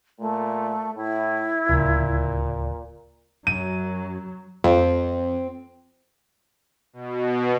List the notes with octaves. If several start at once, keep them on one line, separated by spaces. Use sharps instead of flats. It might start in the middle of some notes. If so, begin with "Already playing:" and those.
A#2 A3
A2 E4
D1 C#2 A#2
F#2 F#3 D#7
F2 C4
B2